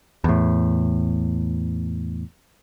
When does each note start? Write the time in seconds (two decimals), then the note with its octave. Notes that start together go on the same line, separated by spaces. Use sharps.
0.24 E2 A2